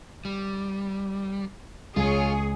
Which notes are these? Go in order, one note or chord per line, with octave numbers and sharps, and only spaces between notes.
G3
C#2 F4 G#4 C#5